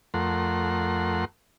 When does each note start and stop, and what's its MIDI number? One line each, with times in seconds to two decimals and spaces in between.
0.14 1.25 41
0.14 1.25 57
0.14 1.25 70
0.14 1.25 78
0.14 1.25 84